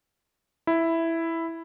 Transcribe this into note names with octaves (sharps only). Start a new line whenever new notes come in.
E4